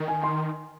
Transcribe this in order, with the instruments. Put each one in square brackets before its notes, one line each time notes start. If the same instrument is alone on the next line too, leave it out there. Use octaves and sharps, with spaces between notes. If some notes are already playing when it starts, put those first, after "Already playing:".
Already playing: [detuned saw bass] D#3
[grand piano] G#5
C6